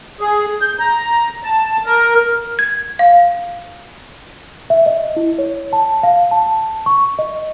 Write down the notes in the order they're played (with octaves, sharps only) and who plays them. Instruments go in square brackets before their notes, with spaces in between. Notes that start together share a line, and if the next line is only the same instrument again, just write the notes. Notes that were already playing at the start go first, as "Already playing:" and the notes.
[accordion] G#4
G6
A#5
A5
A#4
[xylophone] G#6
F5
[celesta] E5
D#5
E4
C#5
A5
F5
A5
C#6
D#5